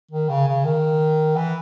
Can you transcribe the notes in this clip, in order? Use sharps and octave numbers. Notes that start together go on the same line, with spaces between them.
D#3
C#3
C#3
D#3
E3